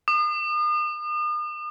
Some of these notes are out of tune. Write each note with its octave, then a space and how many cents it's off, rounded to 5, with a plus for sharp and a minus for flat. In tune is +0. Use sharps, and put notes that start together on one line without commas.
D#6 -40